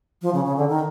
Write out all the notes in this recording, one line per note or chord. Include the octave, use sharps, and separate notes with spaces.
F3
C#3
C#3
D3
D#3